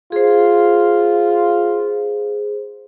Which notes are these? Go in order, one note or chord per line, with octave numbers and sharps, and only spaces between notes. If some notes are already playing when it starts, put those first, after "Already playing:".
F4 G#4 C5